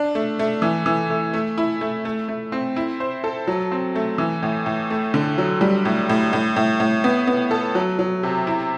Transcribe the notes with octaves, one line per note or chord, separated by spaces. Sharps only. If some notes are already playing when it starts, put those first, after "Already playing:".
Already playing: D4
A3
A3
E3
E3
A3
A3
E4
A3
A3
A3
C4
E4
C5
A4
F#3
C4
A3
E3
A2
A2
A3
D3
F#3
G3
A2
A2
A2
A2
A2
B3
B3
A4
F#3
F#3
C3
E4